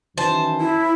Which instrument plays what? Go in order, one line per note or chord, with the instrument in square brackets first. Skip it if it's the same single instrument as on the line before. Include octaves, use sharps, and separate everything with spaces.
[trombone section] F#2 D#3 E3 [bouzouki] C5 A5
[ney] E4